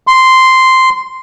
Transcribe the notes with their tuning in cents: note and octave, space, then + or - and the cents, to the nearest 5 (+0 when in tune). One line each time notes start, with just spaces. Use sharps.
C6 -5